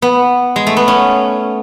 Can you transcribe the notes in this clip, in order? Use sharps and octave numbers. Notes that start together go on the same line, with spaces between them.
B3
G#3
A3
B3
C#4